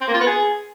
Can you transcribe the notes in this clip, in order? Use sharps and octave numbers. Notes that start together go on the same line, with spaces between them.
C4
A#3
F4
B3
G#4